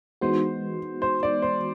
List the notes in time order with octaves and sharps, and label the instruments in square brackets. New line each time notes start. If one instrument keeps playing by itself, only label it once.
[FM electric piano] E3 G#3 B3 D#4 F#4 [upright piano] C5
[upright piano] C5
D5
C5